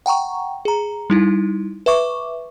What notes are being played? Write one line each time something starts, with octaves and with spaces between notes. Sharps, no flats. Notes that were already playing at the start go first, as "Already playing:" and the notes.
F#5 G5 A#5 C#6
G#4 A#5
G3 D#4 E4
B4 E5 C#6 D6